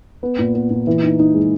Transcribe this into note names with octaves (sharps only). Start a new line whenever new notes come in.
B3
A#2
B3
A#2
E3
D#4
D#4
G#3